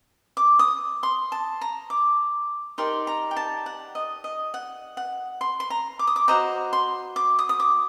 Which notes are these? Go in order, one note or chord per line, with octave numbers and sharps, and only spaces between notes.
D6
D#6
C6
A5
A#5
D6
D#4 G4 A#4 D5 C6
A#5
G5
A5
F#5
D#5
D#5
F#5
F#5
C6
C6
A#5
D6
D#6
D6
F#4 C5 D#5 A#5
C6
D6
D#6
D#6
D6